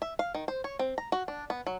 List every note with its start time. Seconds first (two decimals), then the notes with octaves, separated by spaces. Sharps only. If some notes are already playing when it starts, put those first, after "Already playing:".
0.02 E5
0.19 F5
0.35 D#3
0.48 C5
0.64 C#5
0.79 C4
0.98 A#5
1.12 F#4
1.28 D4
1.50 B3
1.67 F#3